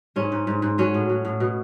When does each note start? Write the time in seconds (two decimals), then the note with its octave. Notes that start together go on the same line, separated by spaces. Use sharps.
0.16 G#2 C#4
0.32 G#2
0.47 G#2
0.62 G#2
0.78 F#3 C#4
0.94 A2
1.09 F#3
1.25 A2
1.40 B2